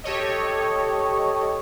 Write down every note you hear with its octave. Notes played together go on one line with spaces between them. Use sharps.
G4 A4 C#5 D#5